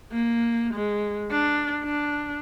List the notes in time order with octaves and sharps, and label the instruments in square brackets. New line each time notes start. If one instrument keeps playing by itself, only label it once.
[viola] A#3
G#3
D4
D4